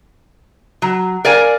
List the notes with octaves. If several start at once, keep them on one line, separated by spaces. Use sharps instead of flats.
F#3
A#4 D5 F5 G#5